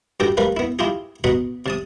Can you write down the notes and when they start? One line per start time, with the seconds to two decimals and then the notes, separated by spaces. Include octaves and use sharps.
0.20 G2 F#4 G4 A4 G5
0.37 G3 A3 A#4 B4 F5
0.57 B3 E4
0.79 E4 F4 G4 G#4
1.24 B2 F#4 D#5 A#5 B5 C#6
1.66 C3 A5 D#6